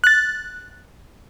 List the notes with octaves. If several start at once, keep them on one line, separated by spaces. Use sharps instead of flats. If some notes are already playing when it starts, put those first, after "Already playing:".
F#6 A6